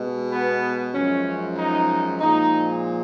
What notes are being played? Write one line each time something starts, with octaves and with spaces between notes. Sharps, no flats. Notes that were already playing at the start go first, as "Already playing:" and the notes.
Already playing: B2 G#3
B3
F#2 F3 G#3 C#4
D#4
A#2 F3 G#3 D#4